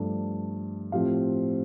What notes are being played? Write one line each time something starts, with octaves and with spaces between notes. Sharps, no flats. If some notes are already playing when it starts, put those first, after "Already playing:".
Already playing: G2 F3 A3 D4 A4
A2 F3 C4 G4 F5